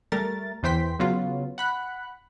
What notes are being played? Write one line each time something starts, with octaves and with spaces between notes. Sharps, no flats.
G3 A3 A#4 A6
E2 E3 C5 G5 C6 B6
C#3 F#3 B3 F4
F#5 B5 F#6